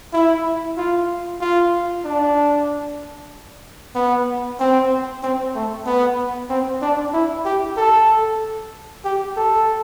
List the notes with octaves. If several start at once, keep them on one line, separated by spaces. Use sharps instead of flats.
E4
F4
F4
D4
B3
C4
C4
A3
B3
C4
D4
E4
G4
A4
G4
A4